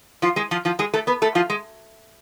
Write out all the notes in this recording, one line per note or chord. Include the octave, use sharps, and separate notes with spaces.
F3 F4
G#3 G#4
F3 F4
F3 F4
G#3 G#4
A3 A4
B3 B4
A3 A4
F3 F4
G#3